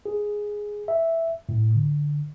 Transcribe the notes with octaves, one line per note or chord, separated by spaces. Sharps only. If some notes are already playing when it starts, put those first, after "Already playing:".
G#4
E5
A2
D3